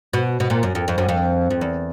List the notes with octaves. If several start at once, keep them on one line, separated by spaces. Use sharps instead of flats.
B2
B2
A#2
F#2
F2
F2
F#2
F2
F2
E2